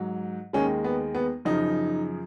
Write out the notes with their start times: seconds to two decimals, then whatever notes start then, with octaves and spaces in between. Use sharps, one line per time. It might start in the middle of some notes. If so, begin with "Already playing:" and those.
Already playing: G#2 F#3
0.53 D#2 D#3 G#3 C#4
0.84 B3
1.15 B3
1.45 F#2 C#3 F3 D#4